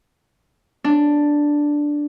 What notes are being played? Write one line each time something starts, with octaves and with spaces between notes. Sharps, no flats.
D4